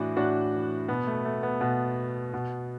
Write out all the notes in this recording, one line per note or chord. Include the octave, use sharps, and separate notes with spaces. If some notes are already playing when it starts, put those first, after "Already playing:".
Already playing: A2 E3 D4 F#4
A2 D4 F#4
E3
B2 B3
A3
A3
B3
B2 B3
B2